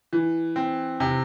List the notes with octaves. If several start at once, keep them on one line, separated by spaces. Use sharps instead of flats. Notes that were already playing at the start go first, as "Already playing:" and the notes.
E3
C4
C3